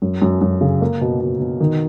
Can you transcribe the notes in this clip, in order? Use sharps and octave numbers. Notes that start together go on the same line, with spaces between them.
F#2
F#2
F#2
C#3
A#3
B2
B2
B2
D#3